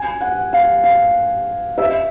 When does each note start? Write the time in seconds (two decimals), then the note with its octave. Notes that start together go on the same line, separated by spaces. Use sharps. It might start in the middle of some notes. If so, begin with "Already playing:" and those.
Already playing: G#5
0.21 F#5
0.53 F5
0.84 F5
1.78 E5